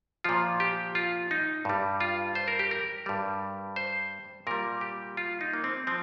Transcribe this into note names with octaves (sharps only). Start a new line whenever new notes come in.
A#2 F3 F4
G4
F4
D#4
G2 G3
F4
C5
A#4
G4
A#4
G2 G3
C5
A#2 G3 A#4
G4
F4
D#4
A#3
C4
F3 C4